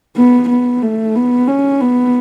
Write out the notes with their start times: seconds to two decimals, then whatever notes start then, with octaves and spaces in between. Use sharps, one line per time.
0.16 B3
0.49 B3
0.82 A3
1.15 B3
1.48 C#4
1.81 B3